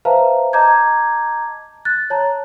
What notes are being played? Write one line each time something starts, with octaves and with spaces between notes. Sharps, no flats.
B4 C5 E5 F5 A5 A#5
D#5 A5 A#5 D6 G6 G#6
F#6 A6
C#5 A5 A#5